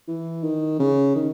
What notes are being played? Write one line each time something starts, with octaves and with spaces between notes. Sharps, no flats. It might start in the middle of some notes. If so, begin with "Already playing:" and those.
E3
D#3
C#3
D#3